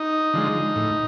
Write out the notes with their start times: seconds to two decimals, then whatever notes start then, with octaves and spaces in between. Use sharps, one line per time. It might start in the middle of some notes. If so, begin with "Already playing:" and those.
Already playing: D#4
0.34 D3 F3 G#3
0.76 A2